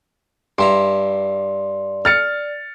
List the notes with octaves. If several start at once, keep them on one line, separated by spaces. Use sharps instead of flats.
G2 E4 D5 A#5 C6
F6 A6 C#7